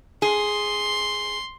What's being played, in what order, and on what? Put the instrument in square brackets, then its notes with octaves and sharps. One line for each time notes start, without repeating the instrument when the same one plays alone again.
[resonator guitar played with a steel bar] G#4 [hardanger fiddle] C6